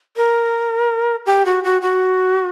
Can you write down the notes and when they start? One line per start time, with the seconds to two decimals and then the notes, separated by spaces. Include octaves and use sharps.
0.17 A#4
1.26 G4
1.46 F#4
1.64 F#4
1.82 F#4